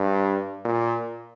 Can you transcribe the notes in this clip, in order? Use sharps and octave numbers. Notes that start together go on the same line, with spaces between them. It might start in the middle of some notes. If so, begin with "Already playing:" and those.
Already playing: G2
A#2